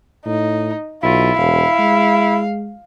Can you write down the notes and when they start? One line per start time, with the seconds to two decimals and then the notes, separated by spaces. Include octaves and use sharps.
0.26 A2 D#4
1.03 B1 E4 F4
1.37 E1 F5
1.79 G#3